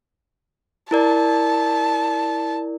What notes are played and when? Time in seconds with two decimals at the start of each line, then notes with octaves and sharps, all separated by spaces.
0.91 E4 A#4 D5 A5